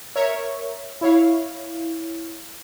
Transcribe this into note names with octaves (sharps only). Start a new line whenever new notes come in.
A#4 C#5 E5
E4 C#5 F5